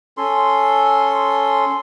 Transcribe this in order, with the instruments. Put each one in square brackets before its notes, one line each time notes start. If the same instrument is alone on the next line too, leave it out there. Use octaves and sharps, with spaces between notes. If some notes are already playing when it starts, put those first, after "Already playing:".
[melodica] C#4 A4 C6